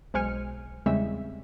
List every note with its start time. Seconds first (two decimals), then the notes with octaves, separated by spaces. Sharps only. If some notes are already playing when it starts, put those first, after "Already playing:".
0.14 B1 G#3 C5 G#5 F6 C#7
0.86 E2 C#3 G3 G#3 C4 E5